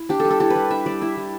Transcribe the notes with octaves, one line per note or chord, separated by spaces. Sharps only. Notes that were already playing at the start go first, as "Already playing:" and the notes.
Already playing: E4
D4 G4
A4
G3
A4
E4 G4
B4
G3
D4 E5
G3 D5
E4 E5
G3